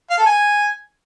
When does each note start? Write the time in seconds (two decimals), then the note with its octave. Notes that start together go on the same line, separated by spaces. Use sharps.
0.10 F5
0.18 A4
0.26 G#5